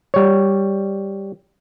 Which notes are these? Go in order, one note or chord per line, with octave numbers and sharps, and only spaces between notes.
G3 C#5